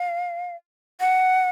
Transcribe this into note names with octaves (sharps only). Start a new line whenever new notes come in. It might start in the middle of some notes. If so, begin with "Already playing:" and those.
Already playing: F5
F#5